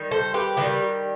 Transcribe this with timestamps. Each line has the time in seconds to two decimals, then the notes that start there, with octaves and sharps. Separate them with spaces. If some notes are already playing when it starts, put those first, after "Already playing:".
Already playing: D#3 G3
0.11 A4 C5
0.34 G4 B4
0.57 D#3 G3 G4 B4